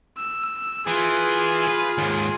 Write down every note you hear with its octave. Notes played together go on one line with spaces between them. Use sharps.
E6
E3 F4 G#4
B4
D#2 G#2